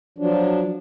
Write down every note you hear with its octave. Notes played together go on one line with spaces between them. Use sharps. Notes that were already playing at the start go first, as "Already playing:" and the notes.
F3 F#3 D4